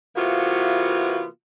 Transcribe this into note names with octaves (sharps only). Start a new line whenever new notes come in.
C3 E3 A#3 B3 F4 F#4